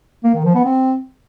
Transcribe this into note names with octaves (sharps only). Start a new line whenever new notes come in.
A#3
D#3
F3
B3
C4